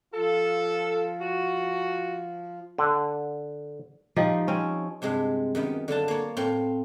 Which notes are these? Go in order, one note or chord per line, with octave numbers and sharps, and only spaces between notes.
F3 F4 A4
F#4
D3
F3 D#4 G4
C4 C#4 C#5
G2 C3 G#3
F#2 D#3 B3
D3 F#3 F4 A5
A#3 C#5
A2 C4 F4